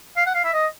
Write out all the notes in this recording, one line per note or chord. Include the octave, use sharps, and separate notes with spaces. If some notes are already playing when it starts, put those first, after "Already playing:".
F5
F#5
F5
E5
D#5